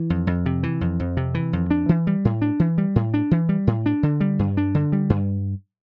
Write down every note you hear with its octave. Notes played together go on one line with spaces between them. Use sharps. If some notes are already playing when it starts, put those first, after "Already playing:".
Already playing: E3
F2
F2
C3
E3
F2
F2
C3
E3
F2
D4
E3
G3
A2
D4
E3
G3
A2
D4
E3
G3
A2
D4
D3
G3
G2
D4
D3
G3
G2